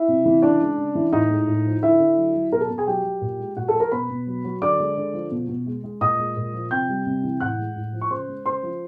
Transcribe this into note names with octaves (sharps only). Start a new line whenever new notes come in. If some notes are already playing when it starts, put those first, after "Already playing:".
Already playing: E4 E5
C3
E3
C#3 D4 D5
G#3
C#3
E3
A2 D#4 D#5
G#3
A2
F3
D3 E4 E5
D3
F#3
F#3
B2 A#4 A#5
A4 A5
B2
G#4 G#5
F#3 G4 G5
F#3
A#2
G#3
A#2 F#4 F#5
A4 A5
F3
A#4 A#5
B2 B4 B5
B2
F#3
F#3
D3 D5 D6
G#3
D3
F3
B2
B2
G#3
G#3
A#2 D#5 D#6
G#3
A#2
F3
C3 G5 G6
G3
C3
E3
A2 F#5 F#6
G#3
A2
F3
C#6
C#3 C5 C6
G#3
C#3 C5 C6
F3